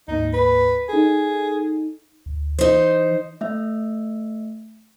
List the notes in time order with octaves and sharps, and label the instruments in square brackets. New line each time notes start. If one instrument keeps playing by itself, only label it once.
[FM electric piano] D2 G#2 A#3 [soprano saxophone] D#4
[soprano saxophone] B4
[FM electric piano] D#4 A4 [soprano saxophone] G#4
[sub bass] D2
[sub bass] E3 [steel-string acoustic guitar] D#4 C5
[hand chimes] A3 E5